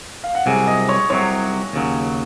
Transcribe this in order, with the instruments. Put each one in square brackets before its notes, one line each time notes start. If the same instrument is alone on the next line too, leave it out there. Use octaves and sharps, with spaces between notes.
[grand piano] F5
F#5
[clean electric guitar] C2 C3 F#3 [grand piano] G#4 G#5
[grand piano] D#5 D#6
C#5 C#6
[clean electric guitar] C2 C3 F#3 [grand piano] C#5 C#6
[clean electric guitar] D#2 C#3 F#3